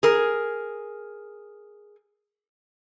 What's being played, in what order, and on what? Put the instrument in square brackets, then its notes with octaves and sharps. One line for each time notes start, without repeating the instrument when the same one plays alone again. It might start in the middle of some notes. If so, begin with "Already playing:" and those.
[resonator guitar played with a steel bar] G#4 A#4